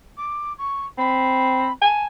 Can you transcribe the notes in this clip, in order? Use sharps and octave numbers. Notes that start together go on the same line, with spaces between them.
D6
C#6
C4 B5
G#5 A5